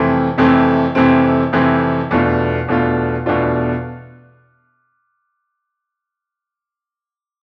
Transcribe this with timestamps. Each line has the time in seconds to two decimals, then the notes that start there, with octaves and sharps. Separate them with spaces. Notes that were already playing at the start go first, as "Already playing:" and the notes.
Already playing: F2 C3 E3 A3 C4
0.38 F2 C3 E3 A3 C4
0.95 F2 C3 E3 A3 C4
1.53 F2 C3 E3 A3 C4
2.11 E2 B2 A3 D4 F4
2.68 E2 B2 A3 D4 F4
3.26 E2 B2 A3 D4 F4